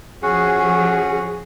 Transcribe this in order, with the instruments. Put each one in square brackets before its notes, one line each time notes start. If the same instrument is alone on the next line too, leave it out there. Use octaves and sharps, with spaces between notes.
[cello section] F3 G#4 [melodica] C#4 F#4 F#5